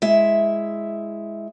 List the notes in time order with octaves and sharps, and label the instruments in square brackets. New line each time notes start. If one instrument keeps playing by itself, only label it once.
[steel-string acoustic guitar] G#3 E4 E5